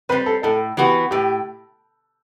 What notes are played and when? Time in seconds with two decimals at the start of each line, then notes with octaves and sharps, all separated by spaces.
0.09 C4 B4
0.12 G3
0.26 A4
0.43 A2 A4
0.77 E3 B3 F#4 G4
1.11 A2 G4